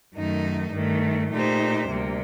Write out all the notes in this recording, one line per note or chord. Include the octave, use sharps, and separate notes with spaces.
F#2 D#3 A3 D#4
G2 D#3 A3
A#2 A3 D#4 G4 C5
D2 C3 G3 A#3